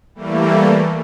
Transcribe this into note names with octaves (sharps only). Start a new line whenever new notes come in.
E3 G3 A3 A#3